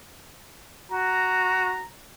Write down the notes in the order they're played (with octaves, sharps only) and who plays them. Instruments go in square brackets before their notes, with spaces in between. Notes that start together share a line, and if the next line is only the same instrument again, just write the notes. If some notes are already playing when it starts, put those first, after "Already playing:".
[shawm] F#4 [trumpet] A#5